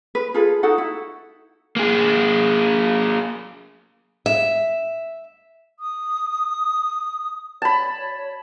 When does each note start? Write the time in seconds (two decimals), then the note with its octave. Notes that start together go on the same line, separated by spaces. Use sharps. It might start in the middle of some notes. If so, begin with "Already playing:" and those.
0.15 B4
0.34 F4 G#4 A4 B4
0.63 D#4 F#4 A4 F#5
0.78 E4
1.76 A#3 G#4
4.26 E5
5.80 D#6
7.62 C#5 A5 B5